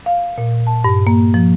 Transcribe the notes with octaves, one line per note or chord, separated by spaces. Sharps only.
F5
A#2
A5
G2
A#3
F3